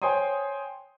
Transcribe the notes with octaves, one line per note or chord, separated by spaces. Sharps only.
C5 C#5 G5 G#5 C6 D#6